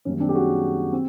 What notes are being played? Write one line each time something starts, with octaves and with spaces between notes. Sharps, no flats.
F#2 D#3 G3 A#3 C#4
C4 D4
G4
F#4 G#4
C4